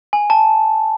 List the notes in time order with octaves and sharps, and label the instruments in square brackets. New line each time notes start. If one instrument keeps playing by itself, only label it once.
[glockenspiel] G#5
A5